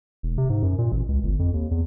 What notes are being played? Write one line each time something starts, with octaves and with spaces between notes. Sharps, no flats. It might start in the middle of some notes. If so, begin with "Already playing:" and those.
E1
C3
G#2
F#2
A#2
A1
C#2
G1
F2
D#2
E2